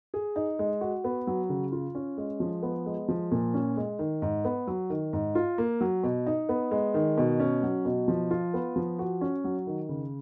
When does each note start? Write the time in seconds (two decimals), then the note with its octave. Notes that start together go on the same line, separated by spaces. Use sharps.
0.14 G#4
0.36 D#4
0.59 G#3
0.81 F#4
1.04 B3
1.27 F#3
1.49 C#3
1.72 F4
1.95 C#4
2.17 G#3
2.40 F3
2.62 B3
2.86 G#3
3.08 F3
3.31 A#2
3.54 C#4
3.77 G#3
3.99 D#3
4.22 G#2
4.45 B3
4.67 F#3
4.90 D#3
5.13 G#2
5.35 F4
5.58 A#3
5.81 F#3
6.04 B2
6.27 D#4
6.49 B3
6.71 G#3
6.94 D#3
7.18 B2
7.40 C#4
7.63 F#3
7.85 B2
8.08 F3
8.31 F4
8.54 B3
8.76 F3
8.99 F#4
9.21 C#4
9.44 F#3
9.67 D#3
9.89 C#3